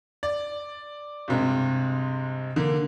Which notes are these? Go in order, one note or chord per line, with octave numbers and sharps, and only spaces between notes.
D5
G2 C3 G#3
D3 A#3